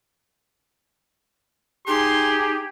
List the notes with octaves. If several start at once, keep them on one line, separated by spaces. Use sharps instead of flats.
D#4 G4 G#4 C6